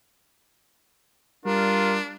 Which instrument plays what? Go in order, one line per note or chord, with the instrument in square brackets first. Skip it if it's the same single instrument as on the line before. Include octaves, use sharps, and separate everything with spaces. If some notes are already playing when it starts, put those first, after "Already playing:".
[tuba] G3 [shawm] D4 [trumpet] F4 [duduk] A#4